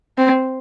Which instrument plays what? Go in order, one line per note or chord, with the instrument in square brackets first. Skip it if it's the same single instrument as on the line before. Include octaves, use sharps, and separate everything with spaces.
[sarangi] C4